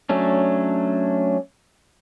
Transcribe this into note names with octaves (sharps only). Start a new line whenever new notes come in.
F#3 A3 C#4 D4